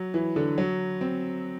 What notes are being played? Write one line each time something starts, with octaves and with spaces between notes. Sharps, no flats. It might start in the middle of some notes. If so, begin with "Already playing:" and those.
Already playing: F#3
E3
D3
F#3
C4